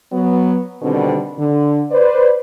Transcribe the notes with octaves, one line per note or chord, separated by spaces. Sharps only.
F#3 B3
B2 D3 D#3 G3 C4
D3
B4 C5 D5